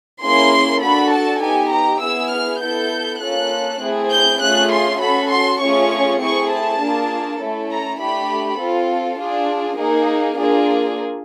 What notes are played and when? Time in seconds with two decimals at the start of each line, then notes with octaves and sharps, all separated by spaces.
0.23 A#3 C#4 E4 G#4 C6
0.82 D4 F#4 A4 B5
1.12 A5
1.42 B3 D#4 G4 G#5
1.72 A#5
2.02 B3 E4 G#4 E6
2.31 F6
2.61 B3 E4 A4 G6
3.21 A#3 C#4 F4 A4 F#6
3.81 A3 C4 E4 G#4
4.10 G6
4.40 A3 C#4 F4 G#4 F#6
4.71 C6
5.00 C#4 F#4 A4 B5
5.30 C6
5.59 A3 C#4 F4 G#4 C#6
6.19 A3 C4 E4 G#4 C#6
6.50 A5
6.79 A#3 D4 F4 G#4
7.39 A3 C#4 E4 A4
7.69 A#5
7.99 A3 D4 G4 B5
8.59 C4 F4 A4
9.18 D4 F4 G#4
9.78 A#3 D#4 G#4
10.38 A#3 D4 F4 G#4